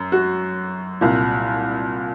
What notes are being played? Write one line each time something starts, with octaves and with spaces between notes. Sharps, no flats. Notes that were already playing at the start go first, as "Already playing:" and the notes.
Already playing: F#2
F#4
C2 A#2